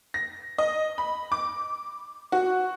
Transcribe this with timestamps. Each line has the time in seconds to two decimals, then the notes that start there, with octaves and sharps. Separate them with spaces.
0.14 A#6
0.58 D#5
0.98 B5
1.32 D6
2.32 F#4